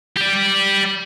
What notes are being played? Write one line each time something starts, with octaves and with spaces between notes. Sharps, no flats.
G4 D5